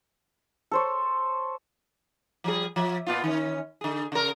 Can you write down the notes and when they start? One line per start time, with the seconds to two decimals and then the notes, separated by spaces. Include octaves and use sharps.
0.71 A4 C5 C#5
2.44 F3 G3 G#4
2.76 F3 E5
3.07 A#2 B3 F4
3.24 D#3 C#4
3.81 D3 G#4
4.12 C#3 A#4